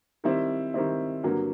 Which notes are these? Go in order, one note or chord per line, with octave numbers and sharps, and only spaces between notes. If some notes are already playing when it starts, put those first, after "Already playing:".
D#3 G3 C4 E4
D#3 G3 C4 E4
G2 D3 F#3 A#3